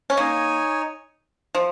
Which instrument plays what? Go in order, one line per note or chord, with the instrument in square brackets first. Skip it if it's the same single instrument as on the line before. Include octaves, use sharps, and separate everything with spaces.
[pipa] C#4
[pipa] A#3 [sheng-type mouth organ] D#4 C#5 G#5
[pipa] F3